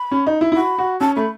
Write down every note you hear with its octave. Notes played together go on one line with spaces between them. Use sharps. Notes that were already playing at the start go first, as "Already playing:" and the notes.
Already playing: B5
C#4
D#4
E4
E4
F#4 B5
F#4
C#4 A5
A3 B5